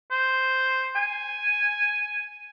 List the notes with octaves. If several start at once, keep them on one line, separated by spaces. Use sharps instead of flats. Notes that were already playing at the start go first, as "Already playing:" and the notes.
C5
G#5